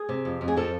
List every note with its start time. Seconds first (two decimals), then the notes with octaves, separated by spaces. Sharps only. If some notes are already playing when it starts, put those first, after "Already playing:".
Already playing: G#4
0.09 C3
0.25 F2
0.41 F2
0.48 G#4
0.57 F3 A4